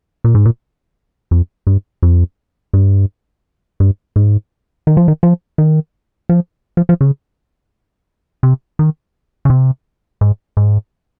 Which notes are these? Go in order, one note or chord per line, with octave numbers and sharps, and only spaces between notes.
A#2
G#2
A#2
F2
G2
F2
G2
G2
G#2
D#3
F3
D#3
F3
D#3
F3
F3
F3
C#3
C3
D#3
C#3
C3
G#2
G#2